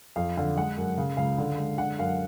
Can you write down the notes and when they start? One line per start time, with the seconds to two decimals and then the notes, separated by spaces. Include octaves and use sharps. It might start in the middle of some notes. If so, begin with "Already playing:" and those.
0.16 F2 F5
0.37 D3 F5
0.57 G#3 F#5
0.77 F#2
0.98 C#3 F5
1.17 C#2 F5
1.38 D3
1.58 G#3
1.78 D3 F#5
1.99 F#2 F5